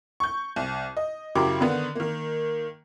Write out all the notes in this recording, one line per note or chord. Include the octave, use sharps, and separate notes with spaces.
C#6 G6
C2
D#5
F#2 C#3 E4 G4 A#4 D6
D3 D#3 B3
D#3 A#3